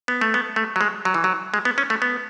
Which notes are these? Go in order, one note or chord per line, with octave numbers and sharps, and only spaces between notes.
B3
A3
B3
A3
F#3
G#3
F#3
E3
F#3
G#3
B3
C#4
A3
B3